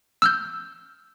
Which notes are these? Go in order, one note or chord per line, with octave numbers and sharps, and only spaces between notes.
E6 F6 G6